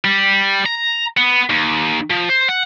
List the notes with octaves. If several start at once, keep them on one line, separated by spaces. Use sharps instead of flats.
G3
A#5
B3
D#2
F3
C5
F#5